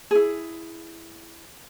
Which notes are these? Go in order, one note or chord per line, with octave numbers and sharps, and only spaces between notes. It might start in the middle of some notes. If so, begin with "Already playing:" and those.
E4 G#4